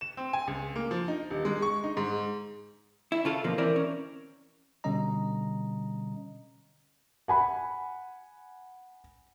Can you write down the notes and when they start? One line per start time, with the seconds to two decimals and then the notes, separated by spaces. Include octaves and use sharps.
0.01 E7
0.17 C4
0.33 G#5
0.47 C#2
0.76 A#3
0.91 F3
1.08 D#4
1.30 D#1
1.45 G#3
1.62 C#6
1.84 D#4
1.97 G#2
3.12 E4
3.25 C#3 F4 A4
3.44 B2 D3 F3 A#3
3.58 E3 C4 E4 A#4 D5
3.76 C#4
4.84 B2 D3 G3 C#4 D#5 A#5
7.28 F#5 G#5 B5